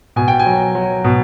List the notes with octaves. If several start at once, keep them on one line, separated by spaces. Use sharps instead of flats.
B2 G#5
G5
G#5
F#3
F#3
B2